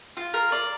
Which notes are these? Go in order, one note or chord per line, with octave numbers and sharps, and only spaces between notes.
F4
A#4
D5